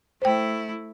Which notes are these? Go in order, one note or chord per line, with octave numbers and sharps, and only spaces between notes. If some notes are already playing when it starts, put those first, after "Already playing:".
A3 E4 C5 G5